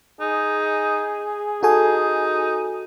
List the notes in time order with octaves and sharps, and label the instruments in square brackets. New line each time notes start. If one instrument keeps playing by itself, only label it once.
[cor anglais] D#4 [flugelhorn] G#4
[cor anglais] D#4 [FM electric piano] F#4 A4 G#5